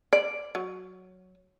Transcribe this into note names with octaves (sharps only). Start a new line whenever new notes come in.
D5
F#3